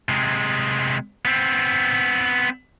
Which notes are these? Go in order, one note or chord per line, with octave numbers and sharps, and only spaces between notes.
C3 G#3
B3 C4